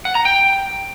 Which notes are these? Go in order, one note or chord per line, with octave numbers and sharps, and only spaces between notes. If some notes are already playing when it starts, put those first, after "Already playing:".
F#5
A#5
G5